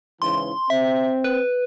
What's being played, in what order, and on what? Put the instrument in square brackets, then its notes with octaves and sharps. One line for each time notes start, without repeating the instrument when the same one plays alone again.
[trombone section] G#2 C#3 E3 [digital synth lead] C6
[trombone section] C4 [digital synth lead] E5
[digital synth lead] B4